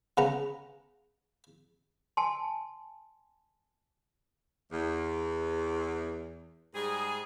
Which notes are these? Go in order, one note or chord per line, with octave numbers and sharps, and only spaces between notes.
C#3 B3 F#5 A#5
G#5 A5 C6
E2
G#2 G3 G#4